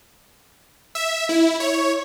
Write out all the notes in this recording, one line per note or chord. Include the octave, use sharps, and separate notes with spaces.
E5
E4
C#5